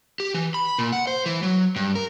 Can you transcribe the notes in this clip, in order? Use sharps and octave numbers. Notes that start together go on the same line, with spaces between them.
G4
E3
B5
A#2
F#5
C5
E3
F#3
G2
A#4